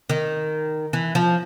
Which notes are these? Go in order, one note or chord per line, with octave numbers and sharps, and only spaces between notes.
D#3
E3
F3